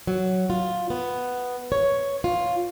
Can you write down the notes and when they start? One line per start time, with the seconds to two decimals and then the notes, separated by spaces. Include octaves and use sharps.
0.07 F#3
0.50 F4
0.90 B3
1.72 C#5
2.24 F4